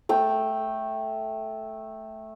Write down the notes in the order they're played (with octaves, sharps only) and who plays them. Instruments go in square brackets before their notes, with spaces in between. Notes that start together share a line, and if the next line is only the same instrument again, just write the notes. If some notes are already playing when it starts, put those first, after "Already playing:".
[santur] A3 G5